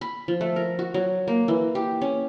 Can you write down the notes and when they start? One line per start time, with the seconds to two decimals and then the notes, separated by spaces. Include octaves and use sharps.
0.01 B5
0.28 F3
0.41 A3
0.56 A#4
0.79 F#4
0.94 F#3
1.28 A#3
1.48 E3
1.75 G4
2.02 C#4